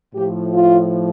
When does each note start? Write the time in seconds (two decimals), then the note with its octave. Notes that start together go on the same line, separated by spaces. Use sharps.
0.14 A2 F3 G4
0.53 F4